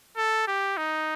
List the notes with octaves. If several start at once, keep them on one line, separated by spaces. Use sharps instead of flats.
A4
G4
D#4